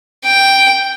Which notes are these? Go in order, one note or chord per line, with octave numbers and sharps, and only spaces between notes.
G5